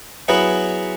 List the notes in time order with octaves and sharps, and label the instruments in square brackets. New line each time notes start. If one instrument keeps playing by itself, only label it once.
[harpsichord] F#3 B3 E4 G#4 B4